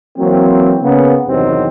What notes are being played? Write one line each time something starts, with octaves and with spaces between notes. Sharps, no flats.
E3 F#3 A#3 C4
C#3 A#3 B3
E2 G2 C3 D#3 F#3 C4